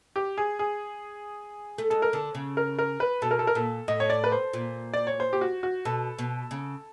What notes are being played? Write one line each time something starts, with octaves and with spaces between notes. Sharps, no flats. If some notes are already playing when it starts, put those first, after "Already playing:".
G4
G#4
G#4
A3
G#3 A4
A#4
D3 A4
C#3
A#4
A#4
B4
B2 A4
A#4
A4
A#4
A#2 A4
A2 D#5
C#5
D5
B4
C5
A#2
D5
C#5
C5
G4
F#4
F#4
B2 A4
B2
C#3